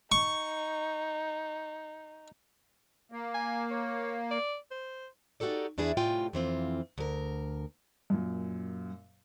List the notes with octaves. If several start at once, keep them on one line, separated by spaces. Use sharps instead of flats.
D#4 C#6
A#3
G#5
C#5
D5
C5
D#4 F#4 G4 A4 D5
E2 D4 E4 G#4
A2 C3 F4 G5 G#5
F2 E3 C4 F4
D2 A#4
F#2 A#2